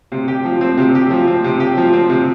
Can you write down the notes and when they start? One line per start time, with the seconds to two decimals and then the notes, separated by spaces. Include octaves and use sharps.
0.12 C3
0.28 G4
0.45 F3
0.61 C4
0.78 C3
0.95 G4
1.11 F3
1.27 C4
1.44 C3
1.60 G4
1.77 F3
1.93 C4
2.10 C3